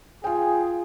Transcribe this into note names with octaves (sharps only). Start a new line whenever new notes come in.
F4 G#4 G5